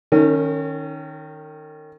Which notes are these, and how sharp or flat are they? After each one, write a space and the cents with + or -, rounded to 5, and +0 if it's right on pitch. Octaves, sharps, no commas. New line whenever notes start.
D#3 +0 C#4 +0 A#4 -40